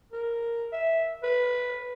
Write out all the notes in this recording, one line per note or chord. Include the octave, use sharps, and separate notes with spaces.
A#4
E5
B4